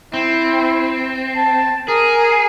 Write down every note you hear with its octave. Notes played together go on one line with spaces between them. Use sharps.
C4 E4
A5
G#4 A#4